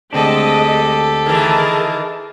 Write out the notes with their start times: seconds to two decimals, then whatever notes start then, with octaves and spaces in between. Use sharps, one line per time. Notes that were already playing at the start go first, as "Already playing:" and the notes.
0.13 D2 G#3 C4 D4 G4 A4 D#5
1.26 D#3 E3 G#4 A#4 A5